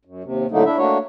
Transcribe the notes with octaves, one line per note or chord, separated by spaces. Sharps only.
F#2
D#2 C3
A2 D3 F#3 A3 A#3 D#4
D4 E4 E5
A3 A#3 D4 F#4 C#5